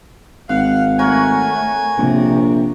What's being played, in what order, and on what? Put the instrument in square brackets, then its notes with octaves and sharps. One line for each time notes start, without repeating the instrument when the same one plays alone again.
[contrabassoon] G#1 [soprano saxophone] F5 [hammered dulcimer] F#5
[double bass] A3 [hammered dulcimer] A#4 C#5 F#5 [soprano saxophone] G#5
[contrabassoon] A#1 [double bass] C3